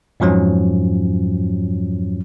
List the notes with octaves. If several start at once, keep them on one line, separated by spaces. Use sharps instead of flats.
F2 G#2 F3 F#3 C#4